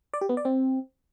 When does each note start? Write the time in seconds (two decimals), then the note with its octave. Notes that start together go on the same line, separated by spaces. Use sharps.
0.13 D5
0.21 G4
0.29 B3
0.37 D5
0.45 C4